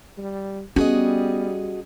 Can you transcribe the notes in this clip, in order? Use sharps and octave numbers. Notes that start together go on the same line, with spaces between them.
G3
G3 B3 C#4 F#4 G#4 D#5